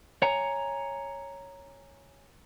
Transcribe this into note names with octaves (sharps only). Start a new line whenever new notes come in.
C#5 F#5 G#5 A#5